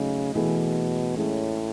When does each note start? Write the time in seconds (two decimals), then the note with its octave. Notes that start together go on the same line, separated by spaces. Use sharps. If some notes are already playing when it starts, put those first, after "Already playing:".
Already playing: C#3 F#3 A3 D#4 F#4
0.35 B2 E3 A3 E4 G#4
1.17 A2 G#3 C#4 G#4